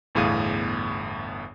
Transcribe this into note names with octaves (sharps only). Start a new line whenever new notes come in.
G1 E2 A2 G#4 F5 D#7